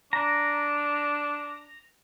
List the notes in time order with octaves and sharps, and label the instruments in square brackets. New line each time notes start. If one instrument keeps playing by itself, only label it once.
[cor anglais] D4 [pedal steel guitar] A#5